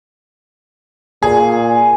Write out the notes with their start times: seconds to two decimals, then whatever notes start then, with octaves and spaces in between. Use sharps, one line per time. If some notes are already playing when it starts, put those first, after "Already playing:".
1.23 A#2 G#4